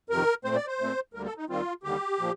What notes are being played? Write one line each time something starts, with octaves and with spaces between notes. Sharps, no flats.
F2 C3 D#3 A#4
A#2 A3 C4 C5
D5
C5
A#2 A3 C4
D2 D3 G3 A#3 A#4
A4
D#4
D#2 D#3 G3 C4 F4
D#2 D3 G3 G4
A#2 F3